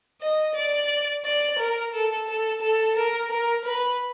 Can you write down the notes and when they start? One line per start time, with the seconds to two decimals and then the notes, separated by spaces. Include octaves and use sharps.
0.21 D#5
0.55 D5
1.25 D5
1.59 A#4
1.93 A4
2.28 A4
2.62 A4
2.96 A#4
3.31 A#4
3.65 B4